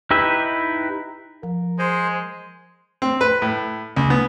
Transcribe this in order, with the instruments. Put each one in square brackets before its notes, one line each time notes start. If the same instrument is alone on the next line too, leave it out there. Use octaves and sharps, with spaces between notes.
[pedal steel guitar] D#4 E4 G4 B4 E5
[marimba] F3 [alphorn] A#4
[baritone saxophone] G#3 [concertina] C5
[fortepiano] C4
B4
A2
C#2
B3